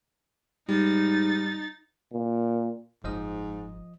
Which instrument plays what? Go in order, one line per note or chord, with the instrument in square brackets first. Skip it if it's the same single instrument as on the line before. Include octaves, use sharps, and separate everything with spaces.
[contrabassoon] G#2 [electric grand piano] G3 [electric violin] D#4 A6
[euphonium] A#2
[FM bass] F#1 [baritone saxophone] G#2 [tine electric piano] F3 D#5 D#6